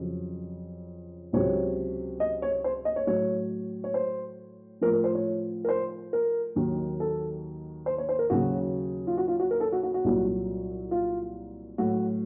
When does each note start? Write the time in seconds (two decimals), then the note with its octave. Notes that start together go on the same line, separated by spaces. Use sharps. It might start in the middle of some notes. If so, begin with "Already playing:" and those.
Already playing: F2 C#3 F#3
1.33 C#2 C3 F#3 C#5
2.20 D#5
2.42 C#5
2.64 C5
2.85 D#5
2.96 C#5
3.07 A2 F#3 C#5
3.84 C#5
3.94 C5
4.81 A2 F3 A#4
4.93 A#4
5.04 C5
5.15 C#5
5.65 A#4
5.69 C5
6.13 A#4
6.56 D#2 D#3 F#3
7.00 A4
7.86 C5
7.98 C#5
8.09 C5
8.19 A#4
8.30 D#2 C#3 F#3 F#4
9.07 F4
9.17 F#4
9.28 F4
9.40 F#4
9.51 A#4
9.60 A4
9.72 F#4
9.83 F#4
9.94 F#4
10.04 C2 A#2 F#3
10.91 F4
11.78 A2 F#3 F#4